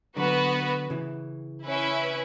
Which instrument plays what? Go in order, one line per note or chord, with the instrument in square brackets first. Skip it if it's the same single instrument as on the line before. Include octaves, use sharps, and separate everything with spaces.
[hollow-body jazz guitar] D3 F#3 [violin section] B3 F#4 B4
[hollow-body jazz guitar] C#3 E3
[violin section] C#4 E4 B4 E5